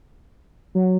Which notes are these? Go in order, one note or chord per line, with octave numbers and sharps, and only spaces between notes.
F#3